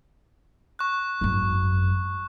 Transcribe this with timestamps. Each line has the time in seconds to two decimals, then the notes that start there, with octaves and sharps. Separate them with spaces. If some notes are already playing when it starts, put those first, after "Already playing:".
0.79 C#6 F#6
1.21 G#1 F#2